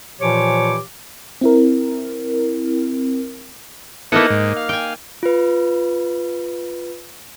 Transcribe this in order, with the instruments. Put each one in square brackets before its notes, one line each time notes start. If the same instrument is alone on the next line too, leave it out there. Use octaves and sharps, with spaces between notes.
[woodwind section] A#2 E3 F3 G4 C#5 D6
[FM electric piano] C4 E4 A#4
[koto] A#3 D#4 F#5 [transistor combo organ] B3 E4 A4
[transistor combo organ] G#2
F5
[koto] G5 G#5
[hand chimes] F4 B4